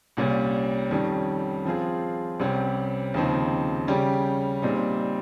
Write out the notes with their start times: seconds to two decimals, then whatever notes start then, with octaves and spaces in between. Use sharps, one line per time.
0.17 C2 A#2 G3 C#4
0.91 F2 D#3 G3 C#4
1.65 F3 C4 F4 G#4
2.40 C2 C3 G3 C#4 G4
3.14 D#2 C#3 F3 C4 D#4
3.88 C#3 G3 C#4 G4
4.62 A#2 G3 C4 D#4